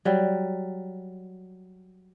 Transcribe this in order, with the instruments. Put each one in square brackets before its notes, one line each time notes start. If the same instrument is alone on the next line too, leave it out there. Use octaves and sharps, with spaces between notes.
[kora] F#3 G3